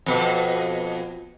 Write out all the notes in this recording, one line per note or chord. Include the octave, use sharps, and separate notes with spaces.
F2 B2